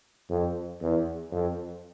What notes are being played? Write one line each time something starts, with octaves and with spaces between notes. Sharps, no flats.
F2
E2
F2